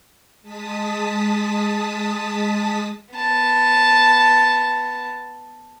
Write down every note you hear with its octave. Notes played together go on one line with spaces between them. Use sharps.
G#3 A5 D#6 B6
B3 A5